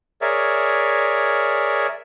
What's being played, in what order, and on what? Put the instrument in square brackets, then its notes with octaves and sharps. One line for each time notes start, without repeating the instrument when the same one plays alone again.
[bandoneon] G#4 A#4 C#5 D5 E5